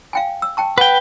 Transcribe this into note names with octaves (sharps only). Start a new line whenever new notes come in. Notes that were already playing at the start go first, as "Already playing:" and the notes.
F5 G5 G#5
E6
G5 A5 C#6
B4 F#5 G5